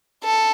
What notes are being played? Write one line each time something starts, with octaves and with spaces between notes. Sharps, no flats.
A4